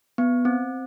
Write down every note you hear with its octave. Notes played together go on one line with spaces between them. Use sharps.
B3
C4